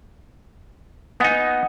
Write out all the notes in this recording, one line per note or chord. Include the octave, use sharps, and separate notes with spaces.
B3 D#4 D#5 F#5 G#5